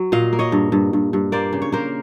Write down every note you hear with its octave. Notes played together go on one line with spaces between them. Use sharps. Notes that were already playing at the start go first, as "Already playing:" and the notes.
Already playing: F#3
A#2 D#5 F5
A#3
C#5 D#5
G2
G2
G2
G2
A#3 C5 D5
C#3
C#5
A#3 A#4 C5